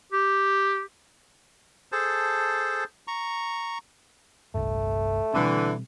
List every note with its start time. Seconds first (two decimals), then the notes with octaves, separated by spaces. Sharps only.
0.12 G4
1.92 G#4 A4 C5 A5
3.07 A#5 C#6
4.54 G1 C2 G2 A3
5.34 B2 D3 E3 G3 C4